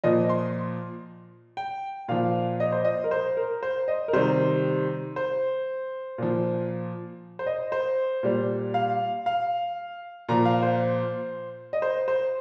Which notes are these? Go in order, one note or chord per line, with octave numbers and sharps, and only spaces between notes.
A#2 F3 D#5
C6
G5
A#2 F3 F5
D#5
C5
D#5
A#4
C5
A#4
C5
D#5
A#4
C3 D#3 G3 C5
C5
A#2 F3
C5
D#5
C5
A#2 G3
F5
F5
A#2 F3 A#5
F5
C5
D#5
C5
C5